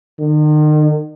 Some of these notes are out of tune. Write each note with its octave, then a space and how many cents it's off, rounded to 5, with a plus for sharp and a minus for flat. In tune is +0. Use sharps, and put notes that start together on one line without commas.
D#3 -40